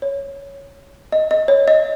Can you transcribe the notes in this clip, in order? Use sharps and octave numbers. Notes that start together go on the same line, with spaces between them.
C#5
D#5
D#5
C#5
D#5